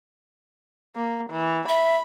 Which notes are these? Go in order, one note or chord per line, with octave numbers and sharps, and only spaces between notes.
A#3
E3
E5 B5